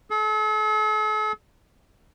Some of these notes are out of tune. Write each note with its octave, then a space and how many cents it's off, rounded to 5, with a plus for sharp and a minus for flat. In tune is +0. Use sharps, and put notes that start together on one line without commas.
A4 -45